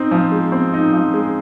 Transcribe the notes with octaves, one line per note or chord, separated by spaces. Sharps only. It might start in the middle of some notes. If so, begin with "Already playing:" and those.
Already playing: C4 D#4
F3
G#3
C4
D#4
F3
G#3